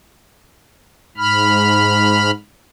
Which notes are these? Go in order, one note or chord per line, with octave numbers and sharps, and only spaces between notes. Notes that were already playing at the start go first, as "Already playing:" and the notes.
G#2 B5 F6